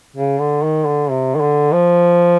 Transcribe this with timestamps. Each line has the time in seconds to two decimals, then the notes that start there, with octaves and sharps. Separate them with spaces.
0.16 C#3
0.40 D3
0.63 D#3
0.86 D3
1.10 C3
1.35 D#3
1.41 D3
1.73 F3